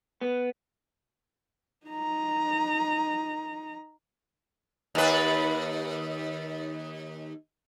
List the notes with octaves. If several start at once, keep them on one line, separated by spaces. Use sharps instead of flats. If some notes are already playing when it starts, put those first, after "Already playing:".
B3
D#4 A#5
D#2 B4